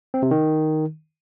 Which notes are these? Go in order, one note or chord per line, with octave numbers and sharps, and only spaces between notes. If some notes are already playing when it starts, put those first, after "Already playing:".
C4
C3
D#3